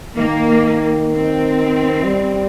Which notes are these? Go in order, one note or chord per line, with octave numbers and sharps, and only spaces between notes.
D#3 A#3
C4
G3